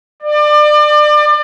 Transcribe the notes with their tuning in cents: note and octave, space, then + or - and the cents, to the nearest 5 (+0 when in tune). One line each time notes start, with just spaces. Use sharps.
D5 +30